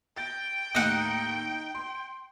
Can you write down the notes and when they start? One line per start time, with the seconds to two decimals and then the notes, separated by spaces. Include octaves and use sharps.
0.17 G5 A6 A#6
0.75 D#2 A2 D#4 F5 F#5
1.75 C6